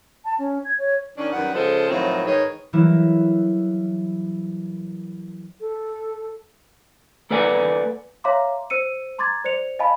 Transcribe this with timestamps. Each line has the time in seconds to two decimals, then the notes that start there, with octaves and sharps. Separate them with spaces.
0.25 A5
0.38 C#4
0.65 G#6
0.78 C#5
1.16 D#3 C#4 D4
1.33 F#2 D#3 G3 B4 F#5
1.53 C#3 F3 G#3 F4 A4 C5
1.90 A2 D#3 F3 F#3 C4 E4
2.25 G#2 D#3 D#4 G#4 B4 C#5
2.73 E3 F#3 G3 A#3 E4
5.61 A4
7.31 A#3 A4 B4 D5 F#5 G#5
8.24 C#5 E5 F5 A#5 C6 D6
8.70 C5 E6 C#7 D#7
9.19 A#5 C6 D6 G#6 A6
9.45 C5 D5 C#7 F7
9.79 D#5 F5 G#5 A5 B5